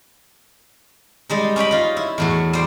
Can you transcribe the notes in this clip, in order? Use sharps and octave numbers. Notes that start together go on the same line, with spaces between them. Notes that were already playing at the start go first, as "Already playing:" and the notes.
G3 G#3 D#4
C#4 D#4 G5 B5
D#4 F4
E4
E2 A2 F#3
G3 C5 G5